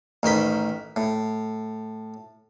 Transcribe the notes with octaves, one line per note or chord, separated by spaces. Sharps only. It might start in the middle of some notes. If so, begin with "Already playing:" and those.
A1 D#3 C5 B5
A2